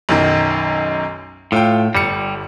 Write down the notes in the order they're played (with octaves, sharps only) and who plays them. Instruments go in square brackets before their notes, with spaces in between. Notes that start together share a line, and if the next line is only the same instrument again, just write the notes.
[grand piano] B1 F#2 D#3
[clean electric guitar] A2 [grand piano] F4 G5
[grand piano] G1 C#7 [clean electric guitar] G3